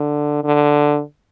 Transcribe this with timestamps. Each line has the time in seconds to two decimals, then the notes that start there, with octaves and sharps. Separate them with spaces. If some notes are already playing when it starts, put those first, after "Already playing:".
Already playing: D3
0.44 D3